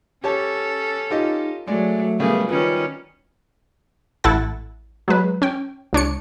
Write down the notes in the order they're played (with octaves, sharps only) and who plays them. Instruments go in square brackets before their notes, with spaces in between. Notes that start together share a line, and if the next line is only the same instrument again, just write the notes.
[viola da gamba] C#4 A4 [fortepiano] G4 C#5 A5
[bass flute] D#4 [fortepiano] F4 G4 D#5
[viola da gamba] F#3 [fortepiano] G#3 D5 [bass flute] A3
[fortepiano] C#3 G3 A#3 [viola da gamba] B3 G#4
[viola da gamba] D#3 G3 C#4 [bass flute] F4 [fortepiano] B4
[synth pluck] A1 E4 A4 F#5 A6
F#3 G#3 B4
C#4 G5
C#2 D4 C#5 C#7